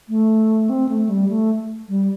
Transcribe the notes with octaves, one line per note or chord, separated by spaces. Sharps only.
A3
C4
A3
G3
A3
G3